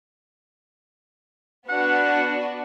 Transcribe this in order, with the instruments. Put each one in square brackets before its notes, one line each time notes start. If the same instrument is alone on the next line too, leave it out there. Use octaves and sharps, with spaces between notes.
[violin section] B3 D4 F#4 [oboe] F#5